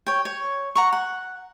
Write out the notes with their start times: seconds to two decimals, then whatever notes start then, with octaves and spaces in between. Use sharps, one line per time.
0.06 C#5 G5
0.25 C#5
0.75 F#5 A#5 C#6
0.93 F#5